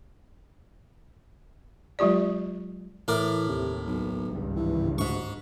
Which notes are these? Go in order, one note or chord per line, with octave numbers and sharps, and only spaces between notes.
F#3 G#3 F4 G4 D5
A2 E3 A#4 D5
D#2 C3
B1
G#1 C#2 G2
E3
D2 G#2 C#6